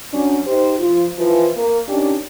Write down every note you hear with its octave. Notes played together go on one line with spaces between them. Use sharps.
F#3 C#4 D4
D#4 G4 C5
F3 F4
E3 F3
A#3
D#3 C#4 D4 G4